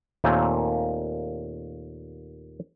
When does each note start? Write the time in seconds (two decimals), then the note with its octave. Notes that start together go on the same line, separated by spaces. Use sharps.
0.24 D#2 A#2 A3 C4 G#5